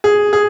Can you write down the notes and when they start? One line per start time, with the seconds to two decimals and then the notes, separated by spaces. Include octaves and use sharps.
0.04 G#4
0.33 G#4